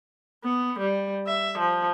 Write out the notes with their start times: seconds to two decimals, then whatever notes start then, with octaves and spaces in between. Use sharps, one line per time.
0.44 B3
0.79 G3
1.27 E5
1.58 F3